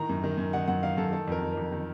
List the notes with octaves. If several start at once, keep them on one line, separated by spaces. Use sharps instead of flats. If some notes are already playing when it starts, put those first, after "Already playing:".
Already playing: A2 D#3 A#5
F#2
D#3
F#2
D#3 F#5
F#2 F#5
D#3 F5
F#2 A4
D#3 A4
F2 A#4
D#3
F2 A#4
D#3